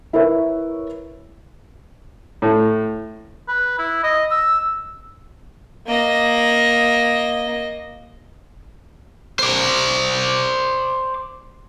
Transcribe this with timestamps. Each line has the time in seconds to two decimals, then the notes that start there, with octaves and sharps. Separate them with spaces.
0.13 E4 A#4 B4 C#5 E5
2.42 A2
3.48 B4
3.78 E4
4.03 D#5
4.31 E6
5.87 A#3 D#5
9.39 C5 D5